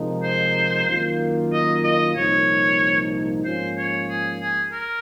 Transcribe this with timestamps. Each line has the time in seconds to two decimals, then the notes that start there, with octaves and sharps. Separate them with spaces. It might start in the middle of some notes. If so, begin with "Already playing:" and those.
Already playing: C3 F3 G#3 D#4 A#4
0.23 C5
0.87 F#2 D#3 A#3 F4
1.53 D#5
1.84 D#5
2.16 C2 A#2 F3 A#3 D#4 C#5
3.44 G#2 F3 A#3 C#4 F4 C5
3.77 C#5
4.09 G#4
4.40 G#4
4.72 A#4